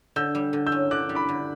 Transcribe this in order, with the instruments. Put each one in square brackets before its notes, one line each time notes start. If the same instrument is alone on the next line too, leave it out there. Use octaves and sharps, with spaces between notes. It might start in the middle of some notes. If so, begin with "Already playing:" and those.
[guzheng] D3 [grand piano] E6 G6
[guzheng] G3
D3
[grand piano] E6 G6
[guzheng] C#4
[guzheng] D3 [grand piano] D6 F#6
[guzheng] G3
[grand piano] B5 D6
[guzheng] D3